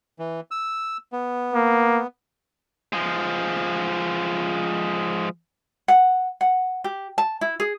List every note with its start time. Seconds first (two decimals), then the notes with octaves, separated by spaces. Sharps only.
0.19 E3
0.51 E6
1.12 B3
1.54 A#3
2.93 F3 G#3
5.88 F#5
6.41 F#5
6.84 G4
7.18 A5
7.41 E4
7.60 G#4